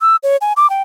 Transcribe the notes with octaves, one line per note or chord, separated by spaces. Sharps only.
E6
C#5
G#5
D6
G5